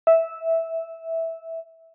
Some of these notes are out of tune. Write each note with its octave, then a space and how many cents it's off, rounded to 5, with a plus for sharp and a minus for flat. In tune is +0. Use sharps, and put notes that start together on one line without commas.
E5 -10